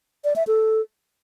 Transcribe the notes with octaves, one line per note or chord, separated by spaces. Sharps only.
D5
E5
A4